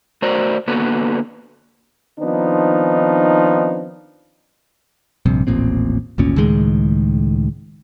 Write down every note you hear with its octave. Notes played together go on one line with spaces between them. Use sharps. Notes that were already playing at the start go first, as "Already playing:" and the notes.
A3 F#4 A#4 C5 D5
D3 A#3 B3 F#4 A4 B4
D#3 F3 B3 C4 D4 D#4
A#1 G2 C3
D#1 A1 A#2 C4
G#1 D2 A#2 C#4
C#2 A2 D#3 G#3